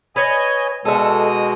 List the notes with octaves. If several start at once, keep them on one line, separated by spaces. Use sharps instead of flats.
B4 C#5 D#5 G#5
B2 G#3 A4 E5 D#6